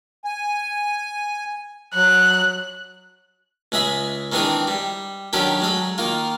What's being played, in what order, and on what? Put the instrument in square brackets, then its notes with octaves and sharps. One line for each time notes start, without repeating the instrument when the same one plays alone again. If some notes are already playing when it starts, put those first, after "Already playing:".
[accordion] G#5
[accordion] F#3 [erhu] F#6
[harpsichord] C#2 G#3 G#4 E5 B5
D#3 E3 G#3 C4 D4 G#4
G3
D#3 F#3 C#4 D4 G4 A4
F#3 G#3 A4
D#3 A#3 F4